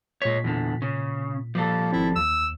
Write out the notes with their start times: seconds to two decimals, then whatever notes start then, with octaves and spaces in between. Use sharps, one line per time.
0.22 A#2 G#3 C#5 B6
0.44 E2 D3
0.82 C#3
1.55 F3 G3 A#3 A4
1.93 G#1 C4 E4
2.16 D#2 E6